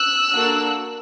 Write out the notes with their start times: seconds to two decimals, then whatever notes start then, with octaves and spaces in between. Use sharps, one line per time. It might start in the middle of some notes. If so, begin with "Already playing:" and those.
Already playing: E6 F#6
0.30 A#3 D4 F#4 A4